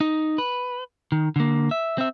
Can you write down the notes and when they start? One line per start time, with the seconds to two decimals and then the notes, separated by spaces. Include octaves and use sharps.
0.01 D#4
0.38 B4
1.12 D#3
1.36 D3 A#3
1.71 E5
1.98 C4 E5